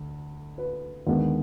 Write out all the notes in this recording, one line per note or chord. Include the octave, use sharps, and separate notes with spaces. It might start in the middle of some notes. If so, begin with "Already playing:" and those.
Already playing: D2
B4
D#2 D3 G#3 B3